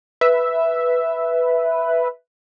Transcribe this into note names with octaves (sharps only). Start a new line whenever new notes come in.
B4 E5